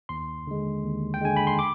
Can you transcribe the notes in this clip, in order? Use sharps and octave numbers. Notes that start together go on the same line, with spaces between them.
D#2 C6
D3 G#3
D#2
G5
D3 G#3 G#5
B5
C6
D6